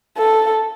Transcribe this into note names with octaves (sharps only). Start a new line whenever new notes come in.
A4